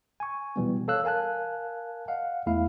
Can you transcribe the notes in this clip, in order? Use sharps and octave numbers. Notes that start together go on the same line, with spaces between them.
G#5 C#6
B2 E3 G3 B3
A4 C#5 F5 E6 F#6
A#4 F5 G#5 A5 F#6
D#5 F5 F#5
E2 A3 E4 F5